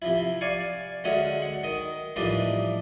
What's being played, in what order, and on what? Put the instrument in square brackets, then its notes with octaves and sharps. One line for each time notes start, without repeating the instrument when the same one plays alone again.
[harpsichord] C3 F3 E4
D5 F5 G#5 C#6
D3 G#3 C#4 F#4 C#5 E5
F#5
D#3 D#5
A2 E3 F3 G3 D4 D#4